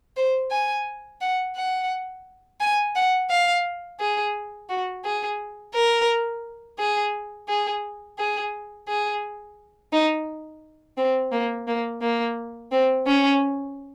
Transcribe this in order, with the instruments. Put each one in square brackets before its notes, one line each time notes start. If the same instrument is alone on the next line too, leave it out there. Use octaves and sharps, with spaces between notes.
[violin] C5
G#5
F#5
F#5
G#5
F#5
F5
G#4
F#4
G#4
A#4
G#4
G#4
G#4
G#4
D#4
C4
A#3
A#3
A#3
C4
C#4